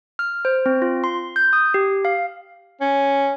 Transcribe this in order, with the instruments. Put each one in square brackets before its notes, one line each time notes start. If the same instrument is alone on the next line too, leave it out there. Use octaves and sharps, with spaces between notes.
[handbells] F6
C5
C4
F4
C6
G6
D#6
G4
F5
[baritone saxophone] C#4